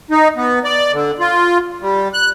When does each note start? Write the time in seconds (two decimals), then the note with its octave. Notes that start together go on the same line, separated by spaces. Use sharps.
0.11 D#4
0.36 B3
0.64 D5
0.93 D3
1.20 F4
1.81 G3
2.14 F#6